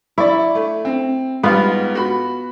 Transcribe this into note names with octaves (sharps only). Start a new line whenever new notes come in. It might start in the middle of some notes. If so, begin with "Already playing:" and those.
E4 D5 C#6
A3
C4
G#2 G3 B3 F4
F#4 B5